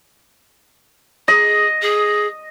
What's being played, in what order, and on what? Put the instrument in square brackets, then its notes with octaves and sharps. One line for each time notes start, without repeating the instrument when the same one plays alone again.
[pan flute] G#4 [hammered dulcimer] D#5
[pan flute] G#4